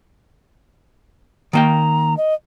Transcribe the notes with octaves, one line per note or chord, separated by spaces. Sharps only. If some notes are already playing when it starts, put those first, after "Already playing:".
D#3 A#3 G5 A#5
D#5